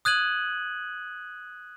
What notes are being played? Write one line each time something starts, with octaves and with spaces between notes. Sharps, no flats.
D#6 F#6 G#6 D#7 F#7